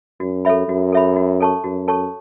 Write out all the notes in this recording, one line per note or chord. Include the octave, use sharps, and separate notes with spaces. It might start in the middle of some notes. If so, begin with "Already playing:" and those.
F#2 F#4
A4 C#5 E5 B5
F#2 F#4
A4 C#5 E5 B5
F#4
A4 C#5 A5 C#6
F#2 F#4
A4 C#5 A5 C#6